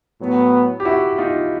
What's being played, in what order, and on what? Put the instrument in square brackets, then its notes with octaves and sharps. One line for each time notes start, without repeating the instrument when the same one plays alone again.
[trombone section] A2 F#3 B3
[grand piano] G4
E4 F#4
D#4 F4